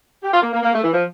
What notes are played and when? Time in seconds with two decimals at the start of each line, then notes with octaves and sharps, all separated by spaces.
0.23 G4
0.32 F4
0.42 A#3
0.53 A#3
0.63 A#3
0.74 A3
0.84 E3
0.94 F3